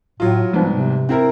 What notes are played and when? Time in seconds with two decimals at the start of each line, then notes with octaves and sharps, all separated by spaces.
0.20 A2 F#3 F4
0.53 C2 G#2 F3 B3
0.72 C3
1.09 C4 E4 A#4